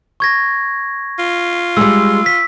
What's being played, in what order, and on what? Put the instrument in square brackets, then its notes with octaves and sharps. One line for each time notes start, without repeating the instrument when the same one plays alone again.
[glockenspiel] C#6 G#6 A#6
[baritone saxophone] F4
[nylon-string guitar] G3 G#3 [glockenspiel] E6
[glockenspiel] B6